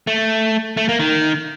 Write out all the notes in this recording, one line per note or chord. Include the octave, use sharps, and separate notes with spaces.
A3
A3
A#3
D#3